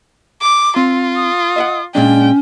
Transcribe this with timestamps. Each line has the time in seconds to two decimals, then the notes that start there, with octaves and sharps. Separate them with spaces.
0.41 D6
0.76 C4 F4
1.16 D#6
1.56 D#5 E5 F#5
1.95 A#2 G#3 C#4 D4 G5